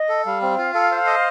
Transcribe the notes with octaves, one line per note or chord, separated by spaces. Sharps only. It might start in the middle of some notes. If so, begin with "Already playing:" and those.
Already playing: D#5
A4
G3 F5
C4
F4
A4
C5
D#5